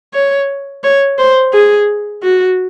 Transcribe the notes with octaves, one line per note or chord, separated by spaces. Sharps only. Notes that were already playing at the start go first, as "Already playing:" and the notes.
C#5
C#5
C5
G#4
F#4